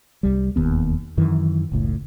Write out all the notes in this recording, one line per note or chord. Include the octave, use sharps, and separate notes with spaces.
C2 G3
E1 D#2 B3
F#2 D#3 E3
F#1 C#2 A2